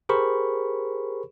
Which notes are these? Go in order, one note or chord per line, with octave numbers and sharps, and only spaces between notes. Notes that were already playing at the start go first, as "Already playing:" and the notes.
G4 G#4 A#4 C5 B5 C#6